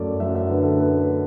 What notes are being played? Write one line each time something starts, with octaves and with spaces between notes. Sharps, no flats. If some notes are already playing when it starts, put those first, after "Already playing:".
Already playing: F#2 A3 D5
F#2 E5
E5
D3 B4
A4
A3 B4